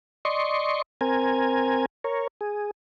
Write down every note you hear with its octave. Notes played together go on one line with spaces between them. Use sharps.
D5 D#5 C6 C#6
C4 A#4 G#5
A#4 C#5
G#4